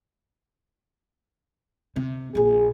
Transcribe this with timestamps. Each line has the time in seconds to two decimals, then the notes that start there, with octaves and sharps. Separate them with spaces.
1.96 C3
2.35 A#1 A#2 G#4